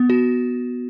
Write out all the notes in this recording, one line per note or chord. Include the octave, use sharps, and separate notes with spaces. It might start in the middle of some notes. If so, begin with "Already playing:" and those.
Already playing: B3
F#4